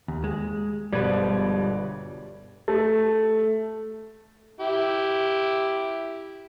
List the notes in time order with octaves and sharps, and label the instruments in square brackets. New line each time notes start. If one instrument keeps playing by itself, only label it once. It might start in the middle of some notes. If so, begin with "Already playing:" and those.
[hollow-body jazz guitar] D#2
G#3
[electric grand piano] G1 D5 G#6 [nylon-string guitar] B2 F3 G#3 [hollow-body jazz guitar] G3 B4
[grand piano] A3
[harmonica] E4 G4